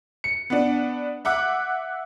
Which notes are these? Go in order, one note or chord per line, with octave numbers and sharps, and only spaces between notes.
C#7
B3 D4
E5 F#5 D6 F#6